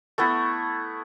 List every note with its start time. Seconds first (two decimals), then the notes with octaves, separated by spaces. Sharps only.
0.18 A3 B3 E4 A4